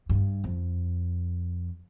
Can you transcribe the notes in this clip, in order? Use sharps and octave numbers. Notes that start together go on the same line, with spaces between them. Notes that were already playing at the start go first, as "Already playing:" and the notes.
G2
F2